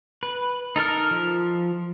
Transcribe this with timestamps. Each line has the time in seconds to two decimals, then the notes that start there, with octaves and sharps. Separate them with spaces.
0.23 B4
0.76 D#4 A4 A#4 F6
1.11 F3